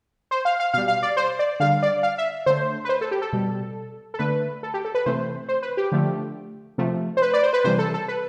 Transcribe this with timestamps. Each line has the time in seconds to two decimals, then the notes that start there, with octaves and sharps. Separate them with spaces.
0.31 C5
0.45 F5
0.60 F5
0.73 B2 G3 F5
0.88 F5
1.03 D5
1.17 C5
1.39 D5
1.60 D3 G3 F5
1.83 D5
2.03 F5
2.18 E5
2.46 D3 A3 C5
2.85 B4
2.89 C5
3.01 A4
3.11 G4
3.22 A4
3.33 B2 G3
4.14 A4
4.19 D3 A3 B4
4.63 A4
4.74 G4
4.85 A4
4.95 B4
5.06 C3 E3 A3 C5
5.48 C5
5.63 B4
5.77 G4
5.92 D3 F3 A3
6.78 C3 F3 A3
7.17 C5
7.22 B4
7.33 D5
7.43 C5
7.53 B4
7.64 C3 E3 G3 C5
7.79 A4
7.94 A4
8.08 B4